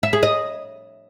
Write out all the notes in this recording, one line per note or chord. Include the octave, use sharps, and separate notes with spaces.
E5
G#4
D#5